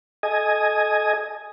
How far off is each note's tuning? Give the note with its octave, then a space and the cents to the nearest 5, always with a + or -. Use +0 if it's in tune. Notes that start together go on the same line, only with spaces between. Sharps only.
A4 -30 D#5 +0 G#5 +0